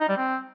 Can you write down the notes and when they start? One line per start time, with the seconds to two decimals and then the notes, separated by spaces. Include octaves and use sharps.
0.01 D#4
0.09 G3
0.17 C4